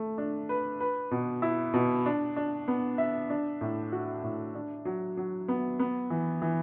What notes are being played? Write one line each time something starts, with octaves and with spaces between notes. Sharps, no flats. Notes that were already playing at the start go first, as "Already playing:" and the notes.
Already playing: A3
D4
B4
B4
B2
E4
B2
D4
D4
B3
E5
D4
A2
F#4
A2
D4
F#3
F#3
B3
B3
E3
E3